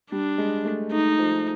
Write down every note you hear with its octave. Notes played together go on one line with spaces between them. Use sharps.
G3 D4
G#3
A3
A3 D#4
F3